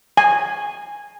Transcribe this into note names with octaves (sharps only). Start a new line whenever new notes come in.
G#5